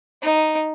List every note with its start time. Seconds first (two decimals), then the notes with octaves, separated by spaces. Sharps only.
0.22 D#4